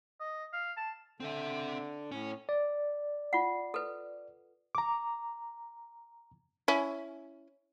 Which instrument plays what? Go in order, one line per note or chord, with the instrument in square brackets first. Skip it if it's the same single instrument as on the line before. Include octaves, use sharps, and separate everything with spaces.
[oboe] D#5
F5
A5
[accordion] D3 [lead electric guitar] C4 E5
[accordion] A2 [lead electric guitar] C#4
[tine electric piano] D5
[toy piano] F4 F#5
A4 B4
[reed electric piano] A#5 D6
[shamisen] C#4 E4